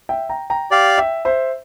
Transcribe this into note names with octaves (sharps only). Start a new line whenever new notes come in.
E5 G5
G5 A#5
G5 A#5
G4 D5 F5
E5 G5
C5 E5